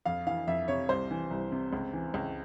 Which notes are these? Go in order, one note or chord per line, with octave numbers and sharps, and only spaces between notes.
F2 F5
E3 F5
F2 E5
C3 C#5
C2 C5
E3
C2
C3
C#2
E3
C#2